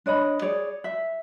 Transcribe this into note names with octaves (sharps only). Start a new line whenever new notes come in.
D4 C#5 D#5 B5
G#4 C#5 D5
E5